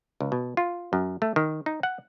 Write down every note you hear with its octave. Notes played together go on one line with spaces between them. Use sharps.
C#2
B2
F4
F#2
A3
D#3
D#4
F#5